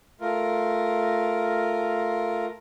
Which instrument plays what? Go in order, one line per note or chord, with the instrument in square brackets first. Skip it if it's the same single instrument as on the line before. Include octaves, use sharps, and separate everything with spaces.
[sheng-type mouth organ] A3 F4 A#4